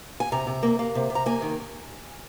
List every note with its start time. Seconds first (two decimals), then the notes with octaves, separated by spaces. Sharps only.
0.20 G#5
0.32 C3 A#5
0.47 C3
0.63 A#3
0.79 A#3
0.95 C3
1.10 C3
1.15 A#5
1.26 A#3 G#5
1.42 D#3